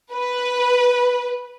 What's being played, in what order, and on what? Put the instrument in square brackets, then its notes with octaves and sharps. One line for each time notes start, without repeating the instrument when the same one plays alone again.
[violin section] B4